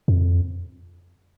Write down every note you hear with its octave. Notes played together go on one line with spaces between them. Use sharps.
F2